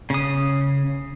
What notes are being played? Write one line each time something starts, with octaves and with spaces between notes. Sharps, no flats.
C#3 D#6